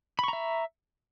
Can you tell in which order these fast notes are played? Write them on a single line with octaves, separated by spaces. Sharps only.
B5 C#6 A#5 E5